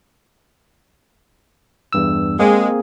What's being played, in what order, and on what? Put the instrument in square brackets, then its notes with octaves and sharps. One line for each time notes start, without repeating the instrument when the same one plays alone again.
[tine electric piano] E2 G2 E6
[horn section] G#3 [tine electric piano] A#3 C4 G#4